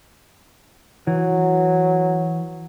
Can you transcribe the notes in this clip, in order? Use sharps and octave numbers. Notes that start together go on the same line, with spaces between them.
E3 F#3